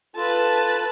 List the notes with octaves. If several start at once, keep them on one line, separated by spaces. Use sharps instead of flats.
F4 A4 B4 A5